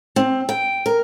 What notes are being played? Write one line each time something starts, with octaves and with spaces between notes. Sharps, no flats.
C4
G5
A#4